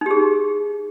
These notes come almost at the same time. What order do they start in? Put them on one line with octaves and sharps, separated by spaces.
D#4 G4 G#4